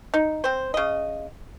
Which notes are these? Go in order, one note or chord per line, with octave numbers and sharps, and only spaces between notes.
D#4
C4 C5
C#3 D#5